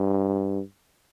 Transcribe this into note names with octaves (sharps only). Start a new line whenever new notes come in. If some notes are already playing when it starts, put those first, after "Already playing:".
Already playing: G2